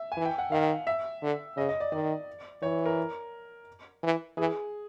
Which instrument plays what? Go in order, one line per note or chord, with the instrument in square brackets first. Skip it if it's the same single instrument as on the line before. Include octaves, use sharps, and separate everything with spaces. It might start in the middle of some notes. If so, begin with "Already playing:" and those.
Already playing: [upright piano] E5
G#5
[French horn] E3
[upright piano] G5
F#5
[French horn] D#3 [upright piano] F5
[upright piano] E5
[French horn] D3
[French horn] C#3 [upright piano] D#5
[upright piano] D#5
D5
[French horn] D#3 [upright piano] D5
[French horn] E3 [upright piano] C#5
[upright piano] A#4
[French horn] E3
[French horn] E3 [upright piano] G#4